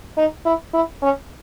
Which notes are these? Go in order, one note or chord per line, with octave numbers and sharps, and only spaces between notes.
D#4
E4
E4
C#4